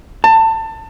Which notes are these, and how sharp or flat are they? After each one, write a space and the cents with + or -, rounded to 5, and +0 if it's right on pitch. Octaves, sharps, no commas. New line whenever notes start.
A5 +25